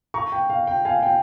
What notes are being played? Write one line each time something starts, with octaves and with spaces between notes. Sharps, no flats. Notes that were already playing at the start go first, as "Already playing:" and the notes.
A#5 C#6
G5
F5
G5
F5 G#5
G5